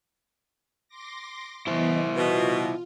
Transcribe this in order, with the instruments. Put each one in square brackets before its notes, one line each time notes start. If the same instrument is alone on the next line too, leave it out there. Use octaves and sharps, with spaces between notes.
[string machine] C6 D6 A#6
[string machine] E3 B3 D#5 [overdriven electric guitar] E4 C5
[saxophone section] B2 [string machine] F4